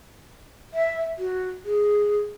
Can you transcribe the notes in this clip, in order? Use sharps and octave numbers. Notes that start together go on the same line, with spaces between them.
E5
F#4
G#4